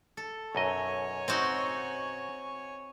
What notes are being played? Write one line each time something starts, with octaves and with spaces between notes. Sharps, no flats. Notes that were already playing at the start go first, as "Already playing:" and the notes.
A4
B1 F#2 C#5 D#5 G#5
C4 D#4 F#4